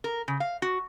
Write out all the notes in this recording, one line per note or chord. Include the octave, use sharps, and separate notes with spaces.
A#4
C#3
F5
F#4